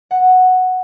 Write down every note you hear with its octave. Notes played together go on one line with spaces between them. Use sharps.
F#5